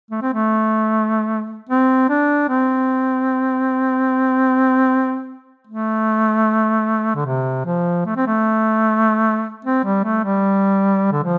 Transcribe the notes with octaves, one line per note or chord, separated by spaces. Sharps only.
A3
C4
A3
C4
D4
C4
A3
D3
C3
F3
A3
C4
A3
C4
G3
A3
G3
D3
F3